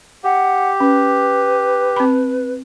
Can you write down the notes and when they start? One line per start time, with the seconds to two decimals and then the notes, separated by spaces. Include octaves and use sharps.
0.24 G4 F#5
0.80 C#4 B4
1.96 C4 B5